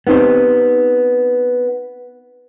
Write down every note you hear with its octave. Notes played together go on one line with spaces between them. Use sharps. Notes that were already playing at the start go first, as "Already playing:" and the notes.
B3 C4 D#4 G4 C5